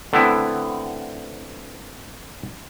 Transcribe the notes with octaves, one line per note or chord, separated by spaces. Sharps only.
D3 A3 B3 C4 E4